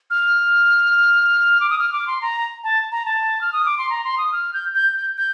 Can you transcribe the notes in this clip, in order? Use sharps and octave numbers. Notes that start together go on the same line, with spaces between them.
F6
D6
D#6
F6
D6
C6
A#5
A5
A#5
A5
F6
D#6
D6
C6
A#5
C6
D#6
F6
G6
G6
G6
G6